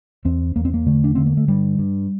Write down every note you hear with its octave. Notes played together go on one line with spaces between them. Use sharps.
E2 C4
E2 A#3
C4
A#3
D3 A3
D4
D3 C4
A#3
A3
G2 G3
G2